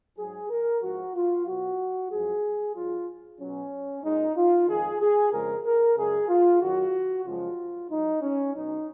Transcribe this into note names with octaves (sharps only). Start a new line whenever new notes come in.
G#2 F#3 G#4
A#4
G#2 F3 G#3 F#4
F4
B2 F#3 F#4
F#2 F3 G#3 G#4
G#2 F#3 F4
B2 F#3 C#4
A#2 G#3 D#4
F4
F2 D#3 G#3 G#4
G#4
F2 C#3 F3 G#3 A#4
A#4
F#2 C#3 G#3 G#4
F4
F#2 D#3 F#3 F#4
F#2 C#3 F3 G#3 F4
G#2 F#3 D#4
C#4
B2 F#3 D#4